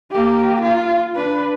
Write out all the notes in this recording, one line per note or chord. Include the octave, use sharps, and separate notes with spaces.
A#3 G4
F4
D4 B4